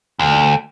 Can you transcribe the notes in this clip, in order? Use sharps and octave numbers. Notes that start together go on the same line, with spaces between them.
D2